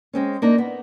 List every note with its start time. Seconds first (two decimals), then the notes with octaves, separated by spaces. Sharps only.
0.13 G#3 C4 C#4
0.42 A#3 D4 D#4
0.58 B3